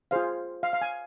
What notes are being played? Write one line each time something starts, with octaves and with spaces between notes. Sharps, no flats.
F4 G#4 C5 F5
F5
F5
G#5